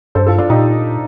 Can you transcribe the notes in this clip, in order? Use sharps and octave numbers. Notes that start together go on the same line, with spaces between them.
G2 A4 C5
F4 A4
D4 F4
A#2 D#4 G4